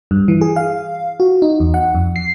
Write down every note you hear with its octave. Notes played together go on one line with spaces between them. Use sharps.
G2
E3
G#4
F5
F#4
D#4
E2
F#5
F2
C7